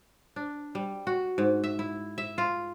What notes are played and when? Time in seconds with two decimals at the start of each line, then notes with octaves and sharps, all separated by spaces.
0.36 D4
0.75 G3
1.07 F#4
1.38 G#2
1.64 E5
1.79 E4
2.18 E5
2.38 F4